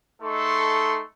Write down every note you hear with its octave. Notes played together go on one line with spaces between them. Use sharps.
G#3 A3 D#4 A4 C6 C#6